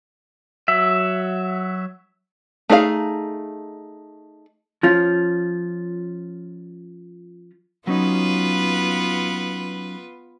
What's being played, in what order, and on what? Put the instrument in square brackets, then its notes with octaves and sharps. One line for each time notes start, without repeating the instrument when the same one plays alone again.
[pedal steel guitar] F#3 E5
[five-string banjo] A3 D#4 G#4 D5 F5
[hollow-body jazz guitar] F3 C#4 F4
[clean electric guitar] F#3 C#4 D#4 [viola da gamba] B3 F4 B4